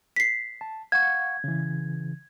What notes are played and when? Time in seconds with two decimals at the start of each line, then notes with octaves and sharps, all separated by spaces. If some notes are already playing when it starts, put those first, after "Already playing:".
0.16 B6 C7
0.61 A5
0.92 F5 F#5 C#6 G#6
1.44 C#3 E3